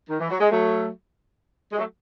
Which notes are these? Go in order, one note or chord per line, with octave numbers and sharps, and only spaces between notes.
D#3
E3
F#3
G#3
F#3 A3
G#3
F#3 A3